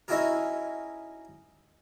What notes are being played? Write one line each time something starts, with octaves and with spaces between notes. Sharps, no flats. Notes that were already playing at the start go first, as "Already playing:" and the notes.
C#4 D#4 E4 F#4 G#4 A#4